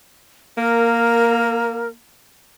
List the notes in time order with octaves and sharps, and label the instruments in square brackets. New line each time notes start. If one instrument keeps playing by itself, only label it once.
[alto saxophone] A#3 [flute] A#4